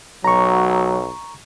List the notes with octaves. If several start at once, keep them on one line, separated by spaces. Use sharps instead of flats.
B1 F#3 A#5 C#6